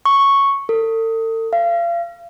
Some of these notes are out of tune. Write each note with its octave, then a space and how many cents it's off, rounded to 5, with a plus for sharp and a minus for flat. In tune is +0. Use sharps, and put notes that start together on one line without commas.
C#6 -5
A4 +40
F5 -35